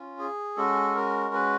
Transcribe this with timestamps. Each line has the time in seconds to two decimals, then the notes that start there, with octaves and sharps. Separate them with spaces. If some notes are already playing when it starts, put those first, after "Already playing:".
Already playing: C#4 F4
0.19 G#4
0.56 G#3 C#4 F#4 A4
0.95 A#4
1.34 B4